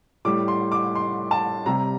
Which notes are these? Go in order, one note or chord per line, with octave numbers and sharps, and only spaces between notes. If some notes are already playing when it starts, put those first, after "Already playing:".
A2 G3 D6
C6
D6
C6
A5
C3 G3 A#5